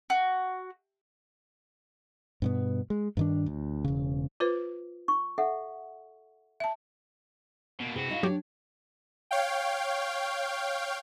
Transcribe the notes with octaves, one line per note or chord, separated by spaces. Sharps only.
F#4
G2 B2 B3
G#3
G2 D#3 D4
D2
E1 C#3
F4 B4 C5
C#6
A4 E5 F#5
E5 A5
B2 A#3
C3 E3 F#4 G#4
D#4 D#5 F5
F#3 D4 G4 C#5
C#5 F5 G5